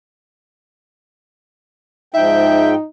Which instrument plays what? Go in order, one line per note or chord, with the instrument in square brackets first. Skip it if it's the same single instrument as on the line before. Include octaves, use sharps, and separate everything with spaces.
[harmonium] G#2 F3 G5 [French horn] D#4 [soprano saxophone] E5